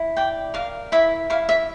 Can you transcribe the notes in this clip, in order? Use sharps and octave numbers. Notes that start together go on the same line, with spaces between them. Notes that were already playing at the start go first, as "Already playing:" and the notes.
Already playing: E4
D5 G5
A#4 F5
E4 E5
E4 F5
E5